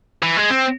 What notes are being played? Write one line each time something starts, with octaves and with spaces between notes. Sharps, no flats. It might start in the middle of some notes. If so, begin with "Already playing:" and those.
E3
G#3
C4